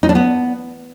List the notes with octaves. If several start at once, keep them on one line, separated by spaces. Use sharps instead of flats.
D#4
D4
B3